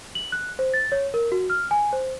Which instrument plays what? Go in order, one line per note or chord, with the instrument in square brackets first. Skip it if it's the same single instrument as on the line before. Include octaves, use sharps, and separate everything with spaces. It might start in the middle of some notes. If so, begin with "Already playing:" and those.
[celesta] F#7
F#6
C5
A6
C#5
A#4
F#4
F6
G#5
C5